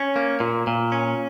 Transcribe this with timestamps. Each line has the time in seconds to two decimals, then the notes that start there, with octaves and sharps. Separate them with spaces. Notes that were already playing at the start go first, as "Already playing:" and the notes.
Already playing: C#4
0.16 A#3
0.40 A#2
0.67 A#2
0.92 C#4